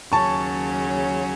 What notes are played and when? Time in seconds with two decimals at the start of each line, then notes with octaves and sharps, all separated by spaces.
0.12 D#2 C#3 F#3 C#4 A5 C#6